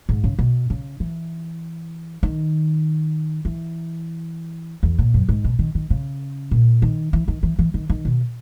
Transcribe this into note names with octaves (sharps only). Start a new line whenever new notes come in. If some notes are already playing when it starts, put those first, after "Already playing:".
G#2
C#3
B2
C#3
E3
D#3
E3
E2
A#2
F#2
G#2
B2
D#3
D#3
C#3
A#2
D#3
E3
D#3
E3
E3
D#3
D#3
B2